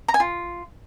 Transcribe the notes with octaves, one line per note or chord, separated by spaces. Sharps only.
A#5
G#5
F4